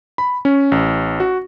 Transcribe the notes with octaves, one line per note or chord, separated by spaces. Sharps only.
B5
C#4
A1
F#4